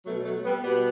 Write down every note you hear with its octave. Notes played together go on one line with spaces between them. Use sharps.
B2 F#3 A3
F#3 A3
G3 B3
B2 G3 B3